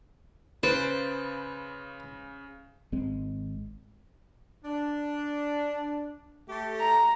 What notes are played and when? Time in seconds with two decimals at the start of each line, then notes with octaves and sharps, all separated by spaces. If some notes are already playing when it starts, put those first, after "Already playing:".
0.63 C#3 B4 C5 A6 D7
2.92 G#1 G#3 C4
4.65 D4
6.49 A3 G4
6.80 A#5